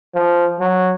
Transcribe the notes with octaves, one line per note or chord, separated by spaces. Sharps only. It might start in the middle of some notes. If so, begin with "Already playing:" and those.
F3
F#3